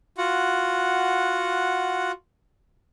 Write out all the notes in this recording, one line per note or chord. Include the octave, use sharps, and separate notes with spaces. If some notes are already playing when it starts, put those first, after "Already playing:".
F4 F#4 F#5